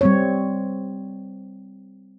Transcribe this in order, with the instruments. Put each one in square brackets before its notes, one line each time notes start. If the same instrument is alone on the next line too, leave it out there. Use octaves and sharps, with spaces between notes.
[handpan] G3 C4 C#5